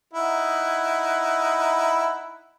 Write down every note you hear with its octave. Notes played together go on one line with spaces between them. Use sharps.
D#4 E4 F#5